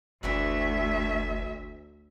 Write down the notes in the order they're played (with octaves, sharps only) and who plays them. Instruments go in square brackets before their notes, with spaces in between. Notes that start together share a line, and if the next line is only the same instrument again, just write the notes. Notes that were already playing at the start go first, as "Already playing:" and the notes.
[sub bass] F#1 [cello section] D2 E5 [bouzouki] E3 A3 F#4